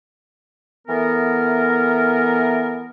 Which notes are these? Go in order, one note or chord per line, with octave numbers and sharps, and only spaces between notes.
E3 A3 B3 A#4